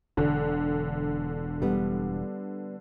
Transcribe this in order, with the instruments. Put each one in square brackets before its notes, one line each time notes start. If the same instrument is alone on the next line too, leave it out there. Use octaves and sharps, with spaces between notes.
[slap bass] E1 [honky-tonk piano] D3
[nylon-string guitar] G3 B3